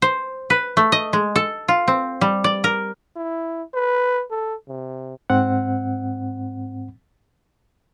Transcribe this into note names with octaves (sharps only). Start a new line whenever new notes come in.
C5
B4
A3
D#5
G#3
A4
F4
C4
G3
D5
A#4
E4
B4
A4
C3
G#2 C4 F#5